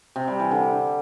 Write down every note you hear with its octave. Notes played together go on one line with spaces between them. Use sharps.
C3
G3
E3
D3